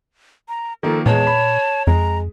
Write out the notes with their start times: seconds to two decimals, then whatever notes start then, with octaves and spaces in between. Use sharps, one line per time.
0.49 A#5
0.83 D#3 F3 A#3 A4
1.06 E2 A#2 G#3 C#5 A5
1.27 B5
1.87 F2 G#3 A#5